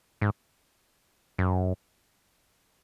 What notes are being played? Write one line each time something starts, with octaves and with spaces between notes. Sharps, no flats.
G#2
F#2